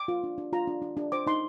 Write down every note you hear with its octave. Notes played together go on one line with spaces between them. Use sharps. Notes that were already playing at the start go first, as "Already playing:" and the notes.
Already playing: D6
F4
D4
D4
F4 A#5
D4
D4
D4
C5 D6
D#4 C6